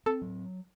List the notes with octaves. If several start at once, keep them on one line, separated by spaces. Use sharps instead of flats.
C4 A4
F#3